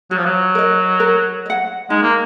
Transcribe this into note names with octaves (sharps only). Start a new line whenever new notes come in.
F#3 F#4
F3
F#3
A#4 D#5
A#4
D#5 F#5
G#3 D#4
A#3